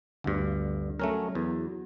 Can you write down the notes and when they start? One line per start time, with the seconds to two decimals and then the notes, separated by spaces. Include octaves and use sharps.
0.24 G1 D2 G2 D3
1.00 F#3 A3 C#4 A#4
1.35 E2